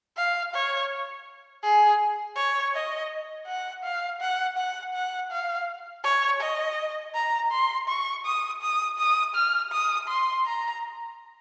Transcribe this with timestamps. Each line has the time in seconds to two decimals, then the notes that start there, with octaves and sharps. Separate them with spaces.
0.16 F5
0.54 C#5
1.63 G#4
2.36 C#5
2.74 D#5
3.47 F#5
3.84 F5
4.21 F#5
4.57 F#5
4.94 F#5
5.31 F5
6.04 C#5
6.41 D#5
7.14 A#5
7.51 C6
7.88 C#6
8.25 D#6
8.62 D#6
8.98 D#6
9.35 F6
9.72 D#6
10.08 C6
10.46 A#5